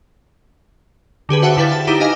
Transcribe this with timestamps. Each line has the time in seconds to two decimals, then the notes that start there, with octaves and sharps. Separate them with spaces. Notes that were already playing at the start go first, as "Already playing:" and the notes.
1.29 D3 G4 G#4 B4
1.42 F#4 C5 E5 F#5 G5 A5
1.57 D3 E4 B4 F5 G5 A6
1.72 A5
1.87 D#4 E4 G4 A#5 D6
2.00 D#4 D#5 F5 G#5